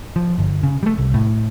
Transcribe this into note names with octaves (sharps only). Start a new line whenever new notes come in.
F3
G1
C#3
G3 A3
C2
A2